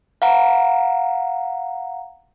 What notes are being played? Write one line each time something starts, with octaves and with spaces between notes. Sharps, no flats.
F5 F#5 A#5